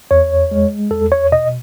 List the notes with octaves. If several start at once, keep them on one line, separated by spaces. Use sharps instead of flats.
E2 C#5
G#3
E2 A4
C#5
B2 D#5